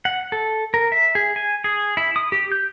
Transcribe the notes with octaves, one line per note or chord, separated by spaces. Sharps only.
F#5
A4
A#4
E5
G#4
G#5
G#4
E4
D#6
G4
G6